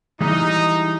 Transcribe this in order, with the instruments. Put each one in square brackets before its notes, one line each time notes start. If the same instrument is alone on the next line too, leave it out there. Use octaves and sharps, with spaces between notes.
[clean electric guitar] E3 G3 G#3 [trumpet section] D#4